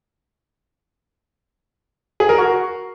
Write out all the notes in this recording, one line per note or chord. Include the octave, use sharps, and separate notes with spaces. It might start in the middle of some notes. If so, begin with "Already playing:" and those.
G#4
A#4
F#4